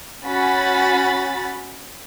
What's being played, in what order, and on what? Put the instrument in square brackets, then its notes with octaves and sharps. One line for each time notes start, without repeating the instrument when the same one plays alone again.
[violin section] C#4 F#4 B5 A6